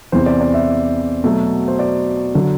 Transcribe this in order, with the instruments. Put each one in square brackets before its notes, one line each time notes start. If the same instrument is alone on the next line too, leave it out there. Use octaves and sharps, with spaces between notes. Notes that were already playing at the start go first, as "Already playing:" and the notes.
[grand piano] E2 C3 E3 C5
D5
D5
E5
B2 F#3 A3
C5
D5
D3 F#3